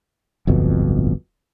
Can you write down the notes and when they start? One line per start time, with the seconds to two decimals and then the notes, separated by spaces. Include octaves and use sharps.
0.47 D1 G1 F2 B2